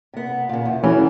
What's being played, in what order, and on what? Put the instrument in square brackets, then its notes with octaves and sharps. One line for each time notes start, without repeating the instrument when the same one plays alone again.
[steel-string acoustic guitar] C3 B3
A#2 C#3
E2
[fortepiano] E3 [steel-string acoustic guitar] F#3 A3 C#4